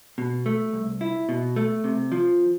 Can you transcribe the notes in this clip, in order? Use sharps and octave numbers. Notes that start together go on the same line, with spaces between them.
B2
A3
C2
E4
B2
A3
C3
F3